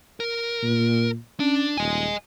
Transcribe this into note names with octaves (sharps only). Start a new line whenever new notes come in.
A#4
A#2
C#4 D4
D#1 D#5 G#5